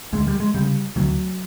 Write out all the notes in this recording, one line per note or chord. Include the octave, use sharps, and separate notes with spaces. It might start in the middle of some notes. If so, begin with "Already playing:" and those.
D2 G#3
G3
G#3
C#3 G3
D2 F#3